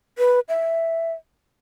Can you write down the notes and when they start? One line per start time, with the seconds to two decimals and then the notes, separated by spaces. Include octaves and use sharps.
0.18 B4
0.49 E5